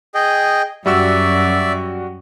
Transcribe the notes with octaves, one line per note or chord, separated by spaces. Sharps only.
G#4 D#5 G5
F#2 G3 F#4 D5 E5 E6